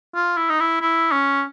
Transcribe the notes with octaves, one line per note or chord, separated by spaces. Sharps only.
F4
E4
D#4
E4
E4
C#4